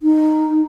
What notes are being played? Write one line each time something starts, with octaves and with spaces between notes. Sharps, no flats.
D#4